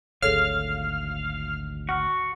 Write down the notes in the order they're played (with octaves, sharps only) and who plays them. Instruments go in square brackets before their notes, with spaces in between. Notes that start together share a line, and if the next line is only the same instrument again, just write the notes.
[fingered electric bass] G#1 D2 [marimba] G#4 A4 C#5 [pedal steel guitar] F5 [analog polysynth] F6
[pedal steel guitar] F#4 [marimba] F#5 F6